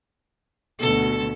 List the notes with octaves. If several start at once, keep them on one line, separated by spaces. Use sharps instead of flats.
D2 B2 A4